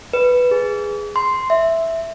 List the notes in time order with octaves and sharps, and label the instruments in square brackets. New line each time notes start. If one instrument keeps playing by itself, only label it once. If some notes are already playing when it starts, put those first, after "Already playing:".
[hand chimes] B4
G#4
C6
E5